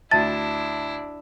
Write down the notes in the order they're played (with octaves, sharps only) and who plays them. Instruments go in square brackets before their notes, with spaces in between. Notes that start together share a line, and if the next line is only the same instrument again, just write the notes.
[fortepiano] D2 E5 [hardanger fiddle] D4 E4 [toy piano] A5 [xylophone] A6